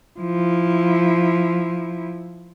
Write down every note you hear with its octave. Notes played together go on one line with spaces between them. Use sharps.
F3 E4